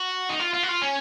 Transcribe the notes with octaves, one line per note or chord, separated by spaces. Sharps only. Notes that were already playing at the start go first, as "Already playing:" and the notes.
Already playing: F#4
D#4
F4
F4
F#4
F4
C#4